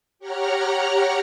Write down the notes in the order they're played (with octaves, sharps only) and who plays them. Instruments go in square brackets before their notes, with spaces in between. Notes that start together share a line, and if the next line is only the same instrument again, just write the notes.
[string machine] G4 C#5 F#5 A#5 F6